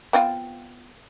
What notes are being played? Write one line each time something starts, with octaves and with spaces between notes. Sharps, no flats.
B3 C4 F4